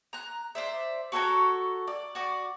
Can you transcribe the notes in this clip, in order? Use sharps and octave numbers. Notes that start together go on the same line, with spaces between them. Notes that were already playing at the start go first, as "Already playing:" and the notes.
A#5 F#6
C5 D5 E5
F#4 A4 C#5 A#5
D5
F#4 D5